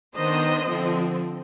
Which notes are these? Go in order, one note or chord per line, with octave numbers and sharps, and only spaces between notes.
D#3 B3 D4 C5 D#5
D3 F3 C4